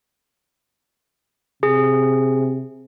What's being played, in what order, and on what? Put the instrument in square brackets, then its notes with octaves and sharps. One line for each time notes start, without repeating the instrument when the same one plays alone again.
[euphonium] C3 [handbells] G#4